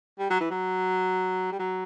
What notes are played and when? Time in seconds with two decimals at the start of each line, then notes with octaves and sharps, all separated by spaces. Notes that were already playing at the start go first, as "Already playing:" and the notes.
0.19 G3
0.31 F#3
0.40 E3
0.51 F#3
1.52 G3
1.60 F#3